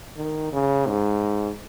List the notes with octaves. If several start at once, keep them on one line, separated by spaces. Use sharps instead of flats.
D#3
C#3
G#2